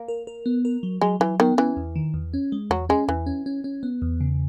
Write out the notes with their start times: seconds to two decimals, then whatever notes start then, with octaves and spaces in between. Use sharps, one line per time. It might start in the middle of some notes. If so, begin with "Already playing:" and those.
Already playing: A#3
0.08 A#4
0.27 A#4
0.46 B3
0.65 A#4
0.83 F#3
1.01 F#3 G#3
1.20 E3 F#3
1.40 D#3 B3
1.58 E3 C#4
1.77 E2
1.96 D#3
2.14 E2
2.34 C#4
2.52 G#3
2.70 E2 F#3
2.89 G#3 C#4
3.08 E2 E3
3.26 C#4
3.46 C#4
3.64 C#4
3.83 B3
4.02 E2
4.21 C#3